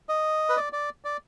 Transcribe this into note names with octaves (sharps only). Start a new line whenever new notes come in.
D#5
B4
D5
D5
D5